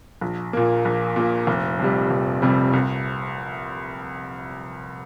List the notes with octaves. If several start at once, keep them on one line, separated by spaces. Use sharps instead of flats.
A#1
A#2 A#3
A#1
A#2 A#3
F1
F2 C3 G3
F1
F2 C3 G3
C2